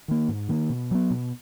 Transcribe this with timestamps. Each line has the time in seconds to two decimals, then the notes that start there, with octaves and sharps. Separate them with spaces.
0.08 D#3 A#3
0.29 G#2
0.49 D#3 A#3
0.70 B2
0.91 F#3 B3
1.11 B2